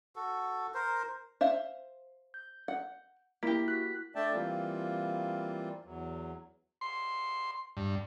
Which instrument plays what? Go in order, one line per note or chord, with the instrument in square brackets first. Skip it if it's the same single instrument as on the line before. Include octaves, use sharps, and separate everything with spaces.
[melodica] F#4 A4
A#4 C5
[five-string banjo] C5 E5 F5
[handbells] G6
[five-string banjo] F#5
[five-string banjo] A#3 G4 [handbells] E4 B6
[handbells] F#4 F#6 B6
[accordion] A3 D4 D5 E5 G5 A5
E3 G3 A#3 C4 F4
E2 F#3
[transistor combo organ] C6
G2